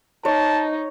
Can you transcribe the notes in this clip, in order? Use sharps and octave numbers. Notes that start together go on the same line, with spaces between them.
D#4 C#5 A5